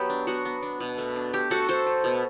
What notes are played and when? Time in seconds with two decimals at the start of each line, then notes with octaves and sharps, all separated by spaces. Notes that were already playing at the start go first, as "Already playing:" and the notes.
Already playing: F#3 B3 G4
0.10 D4
0.27 B3 F#4
0.45 B3
0.63 D4
0.80 B2
0.98 A3
1.16 D4
1.33 A3 G4
1.50 A3 F#4 A4
1.68 A3 A4 C5
1.86 A3
2.04 B2